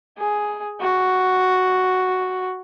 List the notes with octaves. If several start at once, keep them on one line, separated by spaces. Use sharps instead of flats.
G#4
F#4